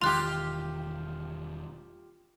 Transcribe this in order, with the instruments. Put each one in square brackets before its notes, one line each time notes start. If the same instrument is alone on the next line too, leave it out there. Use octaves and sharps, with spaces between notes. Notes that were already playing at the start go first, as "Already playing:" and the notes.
[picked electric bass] E1 D#3 G#3 [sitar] F4 G4 [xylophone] C6 F#6